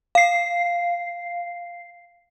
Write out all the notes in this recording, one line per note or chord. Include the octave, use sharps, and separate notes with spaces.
F5 C7